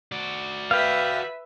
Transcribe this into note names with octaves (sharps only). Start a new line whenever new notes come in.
F#4 D5
B4 E5 F5 G5